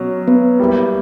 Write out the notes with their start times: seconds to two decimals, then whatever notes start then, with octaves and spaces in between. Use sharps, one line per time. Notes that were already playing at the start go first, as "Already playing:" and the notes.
Already playing: B2 F#3 C#4
0.28 B3 B4
0.60 G3 A#3 E4 G4